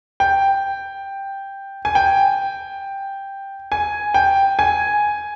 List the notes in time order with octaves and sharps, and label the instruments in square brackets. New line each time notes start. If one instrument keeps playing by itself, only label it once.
[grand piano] G5
G#5
G5
G#5
G5
G#5